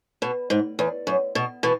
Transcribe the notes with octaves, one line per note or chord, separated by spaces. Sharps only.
B2
G#2
E2
F#2
B2
B2 E3